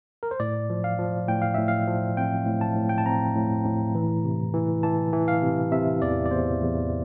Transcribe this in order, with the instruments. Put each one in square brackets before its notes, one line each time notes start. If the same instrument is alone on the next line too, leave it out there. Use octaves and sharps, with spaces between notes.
[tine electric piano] A#4
C5
A2 D5
F3
F5
F3
A2 G5
F5
A2 E5
F5
F3
C4 G5
A2
A5
A2
G5
A5
C4 A#5
A2
A2
E3
C3
E3
E3 A5
E3
F5
C3
C3 E5
E2 D5
D5
E2 C5
E2